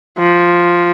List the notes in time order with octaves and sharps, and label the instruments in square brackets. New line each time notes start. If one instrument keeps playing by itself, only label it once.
[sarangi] F3